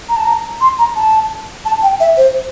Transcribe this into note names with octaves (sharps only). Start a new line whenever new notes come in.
A#5
A5
A#5
C6
A#5
A5
A5
G5
E5
C5